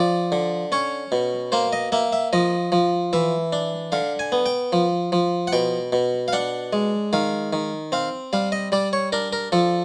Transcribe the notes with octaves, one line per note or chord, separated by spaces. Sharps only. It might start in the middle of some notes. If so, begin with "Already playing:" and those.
Already playing: F3 D5
D3
C#4 C#5
B2
A#3 C5
D#5
A#3 E5
E5
F3 D#5
F3
E3 E5
D4
D3 F5
G#5
B3
G5
F3
F3
F#5
B2 G5
B2
F5
D4 F#5
G#3
D#3 F5
D#3
C4 F5
G3 F5
D#5
G3 D5
C#5
D4 A#4
A#4
F3 A4